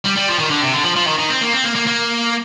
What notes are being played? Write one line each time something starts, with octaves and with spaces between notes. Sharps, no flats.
G3
G3
F3
D#3
D3
C3
D3
F3
F3
D#3
D#3
C4
A#3
C4
A#3
A#3
A#3